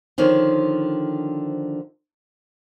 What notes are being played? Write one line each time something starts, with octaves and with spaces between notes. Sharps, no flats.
D3 D#3 F3 C5 C#5